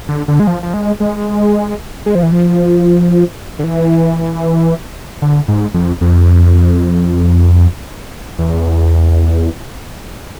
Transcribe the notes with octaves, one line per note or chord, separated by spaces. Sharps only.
D3
D3
G#3
F3
F3
G#3
G#3
G#3
F3
E3
F3
D3
E3
D3
G#2
F2
F2
E2